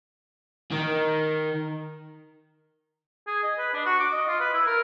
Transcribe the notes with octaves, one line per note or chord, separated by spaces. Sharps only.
D#3
G#4
D#5
B4
D4
F#4
D6
D#5
F4
B4
E4
A#4